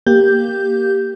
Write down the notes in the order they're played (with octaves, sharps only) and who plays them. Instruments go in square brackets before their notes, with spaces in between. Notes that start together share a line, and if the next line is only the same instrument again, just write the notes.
[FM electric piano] A#3 G4 G6